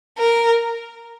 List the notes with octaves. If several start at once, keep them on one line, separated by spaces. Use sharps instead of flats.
A#4